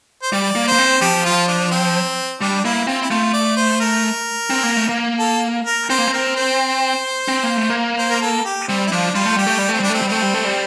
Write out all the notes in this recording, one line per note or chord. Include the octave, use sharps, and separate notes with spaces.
C5
G3 D5
A#3
A#3 C5
C4
F3 G4
F4
D4
C4
G3 D4
A#3 E4
C4 F4
E4
A3 F4
D5
C5
A#4
C4
A#3
A3
A#3
A4
A#4
C4 C5
A#3
C4
A#4
C5
C4
A#3
A3
A#3
C5
A#4
A4
G4
G3 C4
E4
F3 D4
G3 F4
A3
G3 G4
A3
G3
A3 C4
G3 D4
A3 C4
G3
A3 C4
G3
A3
G3